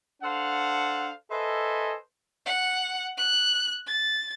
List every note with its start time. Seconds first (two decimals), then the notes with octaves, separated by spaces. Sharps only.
0.22 D4 A4 C5 F5 F#5
1.30 A4 B4 C5 D#5 E5 G#5
2.46 F#5
3.17 F#6
3.87 A6